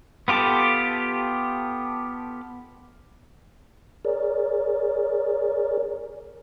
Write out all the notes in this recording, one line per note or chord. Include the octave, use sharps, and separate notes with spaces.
B3 F4 G4 A4 A5
G#4 A#4 C#5 D5